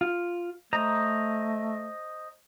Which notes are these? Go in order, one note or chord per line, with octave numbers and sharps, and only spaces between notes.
F4
A3 C5 D#5 A#5